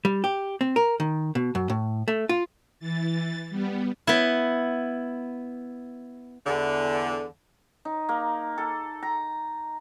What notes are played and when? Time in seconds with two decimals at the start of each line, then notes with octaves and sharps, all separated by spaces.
0.05 G3
0.24 G4
0.61 C4
0.76 A#4
1.00 D#3
1.35 B2
1.55 F#2
1.70 A2
2.08 A3
2.29 F4
2.80 E3 A6
3.50 G3 B3
4.07 B3 E4
6.46 E2 D3
7.85 D#4
8.09 A#3
8.58 A4
9.03 A#5